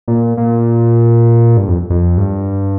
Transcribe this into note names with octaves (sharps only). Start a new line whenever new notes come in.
A#2
A#2
G2
F2
F2
G2